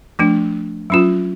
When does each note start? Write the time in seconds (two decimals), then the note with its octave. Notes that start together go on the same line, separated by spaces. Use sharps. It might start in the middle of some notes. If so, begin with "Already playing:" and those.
0.19 F3 A3 D4
0.90 F#3 C#4 F4